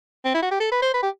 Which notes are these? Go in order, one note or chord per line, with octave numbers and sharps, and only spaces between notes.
C4
E4
F#4
G4
A4
B4
C5
B4
G4